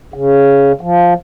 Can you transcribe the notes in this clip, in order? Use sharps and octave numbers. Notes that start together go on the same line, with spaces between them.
C#3
F3